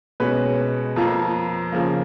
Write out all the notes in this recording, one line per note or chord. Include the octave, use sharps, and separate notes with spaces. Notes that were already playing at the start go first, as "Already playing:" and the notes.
B2 G#3 C#4 F#4 B4
F2 F3 A#3
C#3 F3 A#3